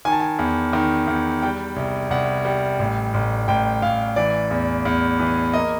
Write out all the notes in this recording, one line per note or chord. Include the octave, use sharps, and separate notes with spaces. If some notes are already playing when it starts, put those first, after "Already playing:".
D#3 G#5
A5
G#5
E2
D#3
E2
G3 G5
C2
C2 F#5
G3
A1
A1
A1 G5
A1 F5
E3 D5
E2
E2
E3
A#3 D#5